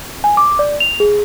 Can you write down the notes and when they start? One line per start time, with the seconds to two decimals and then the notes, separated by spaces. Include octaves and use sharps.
0.24 G#5
0.37 D6
0.59 D5
0.80 F7
1.00 G#4